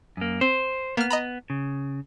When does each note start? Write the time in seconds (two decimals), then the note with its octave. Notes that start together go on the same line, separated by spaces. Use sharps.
0.17 F#2 A#3
0.41 C4 C5
0.97 A#3 B3 F6
1.10 D#5 A#5 B5
1.50 C#3